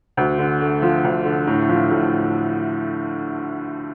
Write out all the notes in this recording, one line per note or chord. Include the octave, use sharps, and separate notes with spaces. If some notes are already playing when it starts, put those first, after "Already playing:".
D2
D3
A3
F3
D2
D3
A2
F3
A2